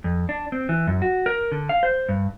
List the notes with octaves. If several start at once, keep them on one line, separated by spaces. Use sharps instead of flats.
F2
D4
C4
E3
F#2
F#4
A#4
D3
F5
C5
G2